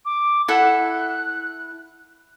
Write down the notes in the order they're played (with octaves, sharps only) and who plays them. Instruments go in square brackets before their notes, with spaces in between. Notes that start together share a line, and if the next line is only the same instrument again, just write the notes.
[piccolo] D6
[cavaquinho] E4 A4 F#5 [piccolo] F#6